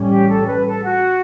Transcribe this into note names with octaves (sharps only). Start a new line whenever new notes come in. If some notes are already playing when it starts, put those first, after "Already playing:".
Already playing: A1 A2 G3 C#4
G4
A4
B4
A4
F#4